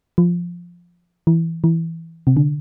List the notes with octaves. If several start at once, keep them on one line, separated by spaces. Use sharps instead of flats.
F3
E3
E3
C3
D3